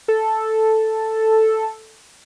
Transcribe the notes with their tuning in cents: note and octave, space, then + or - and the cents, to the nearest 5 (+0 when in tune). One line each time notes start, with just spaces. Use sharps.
A4 +0